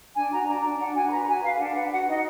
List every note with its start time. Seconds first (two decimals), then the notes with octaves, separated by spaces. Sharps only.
0.14 D4 G#5
0.31 F#4 A#5
0.47 D4 A#5
0.63 D4
0.79 D4 F#5
0.94 F#4 G#5
1.07 B5
1.11 B4 A#5
1.27 F#4 G#5
1.42 B4 F5
1.58 D4 F#5
1.75 B4 F#5
1.91 F#4 F#5
2.07 D#4 D#5